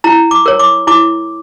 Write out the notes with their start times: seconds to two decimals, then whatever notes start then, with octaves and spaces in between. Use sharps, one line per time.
0.04 E4 A#5
0.31 D6
0.46 A#4 C#5
0.59 D6
0.87 E4 D6